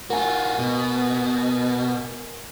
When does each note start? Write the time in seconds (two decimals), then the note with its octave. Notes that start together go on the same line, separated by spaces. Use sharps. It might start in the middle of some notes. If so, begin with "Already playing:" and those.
0.10 F4 F#4 A#4 G#5
0.58 B2